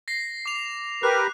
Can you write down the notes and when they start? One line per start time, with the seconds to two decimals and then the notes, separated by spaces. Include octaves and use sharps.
0.08 A#6 C7
0.46 D6 F7
1.03 G4 A#4 B4 F#6